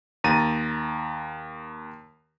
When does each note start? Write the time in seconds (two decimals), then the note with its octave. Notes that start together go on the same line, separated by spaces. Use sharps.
0.24 D#2 A#5 A6 D#7